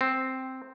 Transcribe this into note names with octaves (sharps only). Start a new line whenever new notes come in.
C4